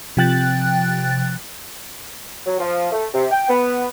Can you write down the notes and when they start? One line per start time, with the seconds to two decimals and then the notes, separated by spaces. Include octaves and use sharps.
0.17 C3 F3 G5 F#6 A6
2.46 F#3
2.59 F3
2.92 A3
3.14 C3
3.31 G5
3.49 B3